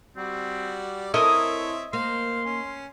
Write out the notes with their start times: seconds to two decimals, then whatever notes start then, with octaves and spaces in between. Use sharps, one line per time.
0.17 G3 C4 F#4 D5
1.14 C4 E4 A4 A#4 C#5 D#5 E5
1.93 A#3 C5 F5 C6
2.45 C#4